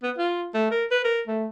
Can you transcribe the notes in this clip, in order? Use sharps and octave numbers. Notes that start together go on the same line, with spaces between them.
B3
F4
A3
A#4
B4
A#4
A3